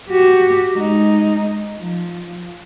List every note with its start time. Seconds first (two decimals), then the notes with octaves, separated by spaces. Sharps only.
0.10 F#4 G4
0.75 G#3 D#4
1.79 F3